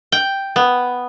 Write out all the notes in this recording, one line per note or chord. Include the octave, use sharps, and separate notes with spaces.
G5
B3